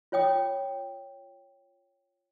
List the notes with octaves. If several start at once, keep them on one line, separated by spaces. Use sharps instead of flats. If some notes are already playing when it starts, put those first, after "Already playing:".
F4 C#5 G5 D#6